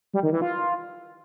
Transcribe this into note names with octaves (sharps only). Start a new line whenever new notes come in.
G3
D#3
E3
F4